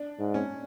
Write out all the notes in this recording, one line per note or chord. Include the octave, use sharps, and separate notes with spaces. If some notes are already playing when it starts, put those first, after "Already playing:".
Already playing: D4
G#2
C#4